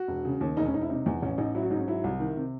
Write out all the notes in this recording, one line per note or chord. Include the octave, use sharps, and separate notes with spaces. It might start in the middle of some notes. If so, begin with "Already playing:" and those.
Already playing: F#4
E1
C#3
D#2
E1 D#4
C#4
E1 D#4
E4
C3 D#4
E2
A1 C#4
A1 D#4
F#3 E4
F#4
G#2 D#4
C#4
F#3 E4
C2
D#3
C3